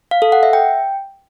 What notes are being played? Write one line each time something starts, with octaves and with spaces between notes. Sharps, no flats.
F5
A4
F#5
E5
G5